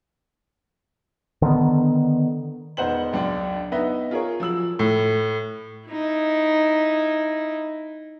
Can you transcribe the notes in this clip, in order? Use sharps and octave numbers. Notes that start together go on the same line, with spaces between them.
D3 D#3 B3
E1 B3 D#4 C5 F#5 F#7
C#2 F#2 D4
B3 D#4 B4 D#5 E5
F4 G#4 A#4 C#5
F3 F#3 E6 F#7
A2
D#4 E4